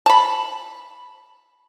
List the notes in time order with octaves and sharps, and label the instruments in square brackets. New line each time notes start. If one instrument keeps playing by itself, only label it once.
[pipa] A5 B5